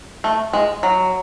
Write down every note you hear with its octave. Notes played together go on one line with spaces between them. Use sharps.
A3
G#3
F#3